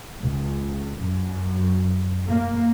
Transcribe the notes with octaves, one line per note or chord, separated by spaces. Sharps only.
C#2
F#2
A#3